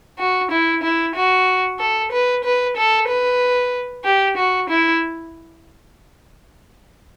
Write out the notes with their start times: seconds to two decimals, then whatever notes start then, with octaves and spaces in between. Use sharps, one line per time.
0.19 F#4
0.51 E4
0.83 E4
1.15 F#4
1.79 A4
2.12 B4
2.44 B4
2.77 A4
3.09 B4
4.05 G4
4.37 F#4
4.69 E4